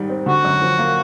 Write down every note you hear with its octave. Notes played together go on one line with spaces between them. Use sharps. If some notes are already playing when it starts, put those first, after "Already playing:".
Already playing: G#2 D#3 G3
C4
D3 F#4
F#2
F3
A#3